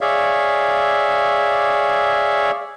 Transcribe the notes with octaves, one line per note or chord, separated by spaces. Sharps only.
G#4 C#5 D5 E5 F5